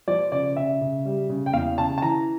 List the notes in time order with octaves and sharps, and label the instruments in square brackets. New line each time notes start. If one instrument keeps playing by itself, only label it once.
[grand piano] F3 D5
C#3 D5
C#3 E5
C#3
G3
C#3
G5
E2 F5
C#3 A5
A5
E3 A#5